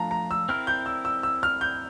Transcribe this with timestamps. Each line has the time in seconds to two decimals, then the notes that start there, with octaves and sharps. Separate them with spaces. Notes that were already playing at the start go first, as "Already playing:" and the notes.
Already playing: F3 A3 D4 F4 F5 A5 A#5
0.11 A#5
0.31 E6
0.49 C4 E4 A#4 F6
0.67 G6
0.86 E6
1.05 E6
1.23 E6
1.43 F6
1.61 G6